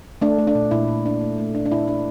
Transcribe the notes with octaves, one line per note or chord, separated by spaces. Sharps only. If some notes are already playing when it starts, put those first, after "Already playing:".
A3 D4
A3
D4
A#2
A#2 E4
A#2
D4
A3
A3
D4
D4
A#2 E4
D4